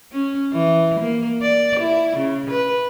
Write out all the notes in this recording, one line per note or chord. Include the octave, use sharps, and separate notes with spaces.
C#4
E3
A#3
D5
E4
C#3
B4